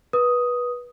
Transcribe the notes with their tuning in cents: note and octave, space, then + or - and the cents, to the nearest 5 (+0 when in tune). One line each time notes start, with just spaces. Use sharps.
B4 -20 D#6 +5